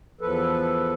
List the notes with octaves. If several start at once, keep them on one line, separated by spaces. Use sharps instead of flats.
E2 F3 A4 B4